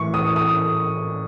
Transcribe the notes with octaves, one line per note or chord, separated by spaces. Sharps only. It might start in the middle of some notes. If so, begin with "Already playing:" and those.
Already playing: A2 E3 C#6
D#6
D#6